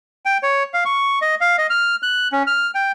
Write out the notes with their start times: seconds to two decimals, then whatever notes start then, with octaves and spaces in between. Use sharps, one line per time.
0.25 G5
0.43 C#5
0.74 F5
0.85 C#6
1.22 D#5
1.41 F5
1.58 D#5
1.70 F6
2.03 F#6
2.32 C#4
2.47 F6
2.75 G5